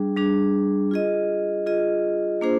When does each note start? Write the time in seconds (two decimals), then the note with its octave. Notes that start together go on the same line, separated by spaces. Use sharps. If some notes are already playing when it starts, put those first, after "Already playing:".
Already playing: G3 D4 G#4
0.16 G3 D4 G#4
0.91 F4 G#4 D#5
1.66 F4 G#4 D#5
2.41 A#3 D4 F4 G#4 C5